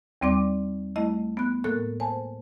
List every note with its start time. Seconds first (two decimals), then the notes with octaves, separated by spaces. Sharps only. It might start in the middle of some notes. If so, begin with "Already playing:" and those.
0.21 D#2 G3 C4 D5 D6
0.96 G3 A3 E4 D#5
1.37 B3 F#6
1.64 A2 A#3 A4 A#4 F#6
2.00 C5 G#5 A5